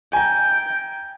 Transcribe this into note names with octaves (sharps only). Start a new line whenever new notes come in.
G5 G#5 A#5